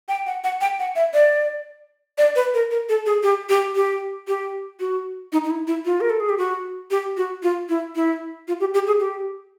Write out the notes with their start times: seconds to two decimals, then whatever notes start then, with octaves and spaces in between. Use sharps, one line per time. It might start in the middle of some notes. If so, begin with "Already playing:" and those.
0.09 G5
0.26 F#5
0.44 F#5
0.61 G5
0.79 F#5
0.96 E5
1.14 D5
2.18 D5
2.36 B4
2.54 A#4
2.71 A#4
2.89 A4
3.06 G#4
3.23 G4
3.49 G4
3.75 G4
4.28 G4
4.80 F#4
5.33 D#4
5.44 D#4
5.51 E4
5.67 E4
5.86 F4
6.01 A#4
6.10 A4
6.20 G#4
6.29 G4
6.38 F#4
6.91 G4
7.17 F#4
7.43 F4
7.69 E4
7.96 E4
8.48 F4
8.60 G4
8.74 G4
8.87 G#4
9.00 G4